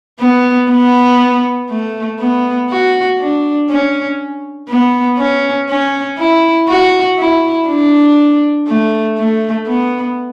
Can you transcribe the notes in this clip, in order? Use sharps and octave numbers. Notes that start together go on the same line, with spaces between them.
B3
B3
A3
B3
F#4
D4
C#4
B3
C#4
C#4
E4
F#4
E4
D4
A3
A3
B3